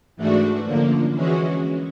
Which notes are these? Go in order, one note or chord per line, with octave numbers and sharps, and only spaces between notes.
G#2 E3 A3 D4 F#4
F#2 D3 F3 A#3
E3 G#3 C#4 F#4